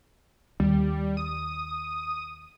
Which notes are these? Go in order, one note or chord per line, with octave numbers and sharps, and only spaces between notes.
D#2 G3
D#6